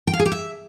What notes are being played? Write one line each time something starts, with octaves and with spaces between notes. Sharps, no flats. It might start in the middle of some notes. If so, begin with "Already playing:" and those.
G5
F5
G#4
G4
E5